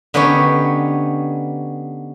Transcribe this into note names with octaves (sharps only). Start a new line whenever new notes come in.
D3 B3 C#4 D#4 G4 C#5